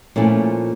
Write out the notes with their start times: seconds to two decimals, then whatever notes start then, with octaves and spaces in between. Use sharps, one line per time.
0.16 A#2 F3 A3 C#4 E4